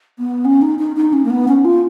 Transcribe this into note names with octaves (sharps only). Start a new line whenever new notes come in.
B3
C#4
D#4
D#4
D#4
C#4
A#3
B3
C#4
F4